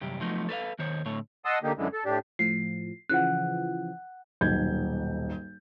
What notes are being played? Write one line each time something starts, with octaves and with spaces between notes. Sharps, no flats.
C2 F#2 G4
F3 F#3 A3 B3 D#4
A4 B4 C#5 F5
D#2 D#3 C5 C#5
A2 D3 A3 C#5
D#5 F#5 A5 C6 D#6 E6
D3 A#3 D#4 G4
F#2 D3 E3 G#3
A4
A2 D4 G4
A2 F3 C7
C#3 E3 F3 F#5 F#6
D#1 B1 G6 G#6